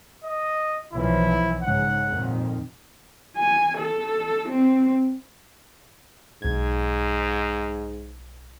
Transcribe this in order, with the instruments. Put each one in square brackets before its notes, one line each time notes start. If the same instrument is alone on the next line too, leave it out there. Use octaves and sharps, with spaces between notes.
[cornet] D#5
[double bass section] B1 E3 F3 [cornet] E4
[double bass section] G#2 C#3 [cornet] F#5
[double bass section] F2 A#2 D#3
[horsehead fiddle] G#5
A4
C4
[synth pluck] B1 G#6 [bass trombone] G#2